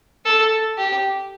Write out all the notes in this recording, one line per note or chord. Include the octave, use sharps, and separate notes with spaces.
A4
G4